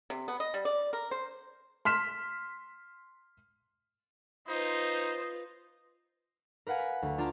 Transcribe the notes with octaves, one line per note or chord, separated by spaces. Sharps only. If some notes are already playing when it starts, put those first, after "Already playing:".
C3
B3
D#5
G3
D5
A#4
C5
C6 F6 B6 E7
D#4 F4 B4 C5 D#5
A#4 B4 F5 F#5 G#5
B6
D2
D4 F4 A5 A#5